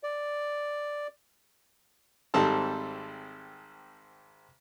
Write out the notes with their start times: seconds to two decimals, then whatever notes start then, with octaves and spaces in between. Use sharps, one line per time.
0.03 D5
2.34 G#1 G#2 G3 C4 A4 A5